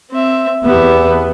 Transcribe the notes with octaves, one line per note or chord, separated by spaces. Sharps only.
C4 E5
E2 B3 G4 E5